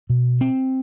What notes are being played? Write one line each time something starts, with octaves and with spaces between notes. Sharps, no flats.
B2
C4